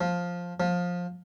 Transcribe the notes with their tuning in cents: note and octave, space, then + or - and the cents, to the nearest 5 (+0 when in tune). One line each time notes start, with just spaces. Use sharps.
F3 +10
F3 +20